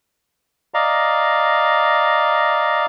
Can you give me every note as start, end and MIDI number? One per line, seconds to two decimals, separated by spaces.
0.74 2.86 74
0.74 2.86 75
0.74 2.86 77
0.74 2.86 82